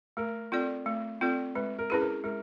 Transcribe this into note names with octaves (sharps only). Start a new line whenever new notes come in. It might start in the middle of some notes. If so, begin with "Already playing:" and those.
A3 A#4
C4 F4 A4 D5
A3
C4 F4 A4 D5
G#3 B4
A#4
C#4 E4 G#4 B4
A#4
G#3 A#4